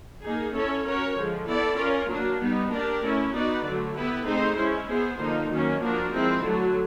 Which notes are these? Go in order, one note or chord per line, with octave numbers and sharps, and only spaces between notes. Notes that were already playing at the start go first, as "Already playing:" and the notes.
A#3 D#4 G#4
C#4 E4 A4 C#5
C#4 F#4 A#4 C#5
D3 F3 G#3
B3 E4 A4 D5
C#4 F4 A#4
F#3 A#3 D4
G3 B3 D#4
A#3 D4 G4 A#4 D5
A3 C#4 E4
B3 D#4 F#4 B4 D5
D3 F#3 A3
B3 E4 G4 B4
A3 C4 D#4 G#4 C5
G#3 C#4 E4
B3 E4 G#4 C5
D3 F3 A#3 D#4
D#3 F#3 A#3 C#4
F3 A#3 D4 F#4 A#4
F3 G#3 C4 E4
D3 F#3 A3